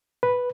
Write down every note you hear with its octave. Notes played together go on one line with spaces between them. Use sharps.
B4